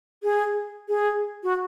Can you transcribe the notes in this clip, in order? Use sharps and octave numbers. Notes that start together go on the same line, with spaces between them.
G#4
G#4
F#4